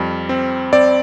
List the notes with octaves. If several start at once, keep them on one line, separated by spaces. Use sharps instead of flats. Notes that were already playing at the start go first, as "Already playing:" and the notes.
Already playing: F2 G3
C4
C4 D5